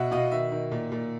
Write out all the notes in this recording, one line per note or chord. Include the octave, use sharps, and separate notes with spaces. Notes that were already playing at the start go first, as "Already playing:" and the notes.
Already playing: B2 E5 F#5
B2 D#5 F5
D#3 E5
D#3
A#2
A#2